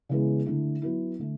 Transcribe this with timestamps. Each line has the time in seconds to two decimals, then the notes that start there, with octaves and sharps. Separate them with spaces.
0.09 C#3 E3 G#3 B3
0.46 D3 A3 E4
0.82 F#3 B3 E4
1.19 D3 A3